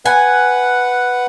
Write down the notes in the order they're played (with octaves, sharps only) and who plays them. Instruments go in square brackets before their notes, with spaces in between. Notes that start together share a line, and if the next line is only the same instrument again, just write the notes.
[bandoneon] B4 F#5 [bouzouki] G#5